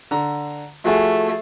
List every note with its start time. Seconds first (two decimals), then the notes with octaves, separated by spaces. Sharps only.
0.11 D3 A#5
0.85 F3 A3 F#4 G#4